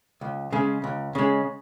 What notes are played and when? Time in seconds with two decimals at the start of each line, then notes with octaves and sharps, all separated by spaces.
0.21 C#2
0.53 C#3 G#3
0.84 C#2
1.15 C#3 G#3